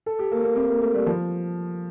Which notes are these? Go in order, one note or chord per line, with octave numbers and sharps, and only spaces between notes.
A4
G4
A#3
A#3
C4
A#3
A3
G3
F3